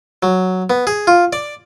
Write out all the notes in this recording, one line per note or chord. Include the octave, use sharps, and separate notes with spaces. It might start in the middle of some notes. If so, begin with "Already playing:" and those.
F#3
B3
G#4
F4
D5